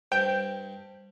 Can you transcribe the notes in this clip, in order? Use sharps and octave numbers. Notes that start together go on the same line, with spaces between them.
G2 C5 G5